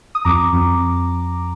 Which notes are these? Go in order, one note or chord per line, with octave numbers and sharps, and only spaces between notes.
D#6
F2 A#5 D6
F2